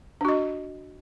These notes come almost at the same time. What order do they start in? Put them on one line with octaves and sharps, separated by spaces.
D4 F#4 D#5